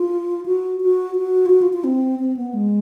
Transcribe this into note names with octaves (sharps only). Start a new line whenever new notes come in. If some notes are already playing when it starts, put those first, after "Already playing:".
Already playing: F4
F#4
F#4
F#4
F4
F#4
F4
F4
C4
C4
B3
G#3